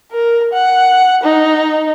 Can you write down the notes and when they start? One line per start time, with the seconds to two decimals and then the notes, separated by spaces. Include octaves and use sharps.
0.12 A#4
0.53 F#5
1.23 D#4